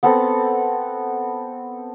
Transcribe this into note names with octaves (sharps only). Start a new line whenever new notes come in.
B3 C4 A4